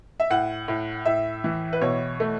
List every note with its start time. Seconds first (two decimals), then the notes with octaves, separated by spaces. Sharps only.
0.20 E5
0.30 A2 F#5
0.68 A2
1.05 A2 E5
1.44 E3
1.73 B4
1.82 B2 C#5
2.20 A3